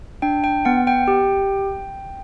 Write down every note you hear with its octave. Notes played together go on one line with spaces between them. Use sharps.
D4 G5
G5
B3 F#5
G5
G4